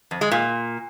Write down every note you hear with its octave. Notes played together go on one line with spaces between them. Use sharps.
F2
G#3
A#2